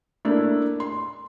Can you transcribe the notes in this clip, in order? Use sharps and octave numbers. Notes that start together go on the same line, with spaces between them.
A3 A#3 D4 E4
C6